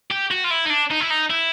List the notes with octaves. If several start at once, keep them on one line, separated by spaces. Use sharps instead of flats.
G4
F#4
F4
E4
D#4
D4
D#4
E4
D#4
E4